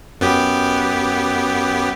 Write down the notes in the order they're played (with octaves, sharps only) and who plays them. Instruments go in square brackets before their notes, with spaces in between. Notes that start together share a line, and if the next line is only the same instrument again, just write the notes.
[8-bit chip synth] F#2 B3 G4